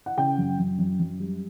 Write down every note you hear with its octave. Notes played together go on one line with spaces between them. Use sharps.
F#5
C#3 G5
F#2
F#2
F#2
F#2
G3